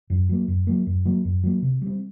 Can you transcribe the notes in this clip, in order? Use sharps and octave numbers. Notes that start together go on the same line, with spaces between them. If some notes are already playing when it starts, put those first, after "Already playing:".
F#2
F#3 A#3
F#2
F#3 A#3
F#2
F#3 A#3
F#2
F#3 A#3
C3
G3 C4